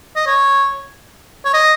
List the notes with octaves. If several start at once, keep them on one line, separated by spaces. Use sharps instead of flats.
D#5
C#5
C#5
D#5